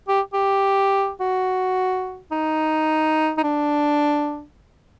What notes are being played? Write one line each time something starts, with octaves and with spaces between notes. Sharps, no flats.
G4
G4
F#4
D#4
D#4
D4